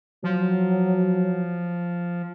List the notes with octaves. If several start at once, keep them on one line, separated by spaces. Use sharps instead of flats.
F3 F#3